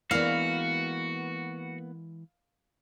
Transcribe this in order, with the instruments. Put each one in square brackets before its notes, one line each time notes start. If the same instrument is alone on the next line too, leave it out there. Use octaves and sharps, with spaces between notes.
[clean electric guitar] E3 G#3 [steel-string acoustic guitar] A#3 B3 [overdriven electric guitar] F#4 [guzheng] F5